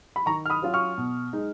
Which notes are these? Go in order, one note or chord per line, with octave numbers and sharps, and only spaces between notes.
B5
D#3 A#5 C#6
F6
B5 D#6
F#3 C#4 F4
C#6 F6
B2
G#3 D#4